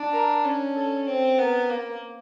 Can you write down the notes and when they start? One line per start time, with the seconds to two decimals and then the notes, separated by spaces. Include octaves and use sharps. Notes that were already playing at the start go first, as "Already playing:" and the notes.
Already playing: D4
0.13 A#4
0.44 C#4
0.76 A4
1.07 C4
1.38 B3 A#4
1.70 A#3